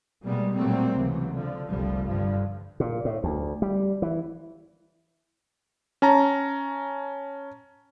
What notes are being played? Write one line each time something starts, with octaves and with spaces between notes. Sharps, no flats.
B2 G3 G#3 A#3 B3
A#2 F#3 G3 A3 A#3 C4
C#2 C3 E3 F#3
D3 F3
F1 C2 D3 F3 G3
G2 D3 F3
A#2
A2
D2
G3
E3
C#4 A5 A#5